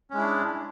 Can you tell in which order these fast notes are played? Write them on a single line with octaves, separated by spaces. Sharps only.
C#4 G#3 E4 D4